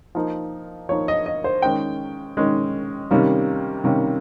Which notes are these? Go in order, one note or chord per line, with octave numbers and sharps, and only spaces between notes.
F3 A#3 D#4
F3 A#3 D#4 C#5
D#5
D#5
C5
D#3 G#3 C#4 G5
D#3 G#3 C#4
C3 D#3 G3 A#3 C#4
C3 D#3 G3 A#3 C#4